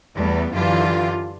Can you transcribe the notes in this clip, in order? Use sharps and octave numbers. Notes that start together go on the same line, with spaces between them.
E2 G3 A3 B3
F#2 D3 E3 F4 G4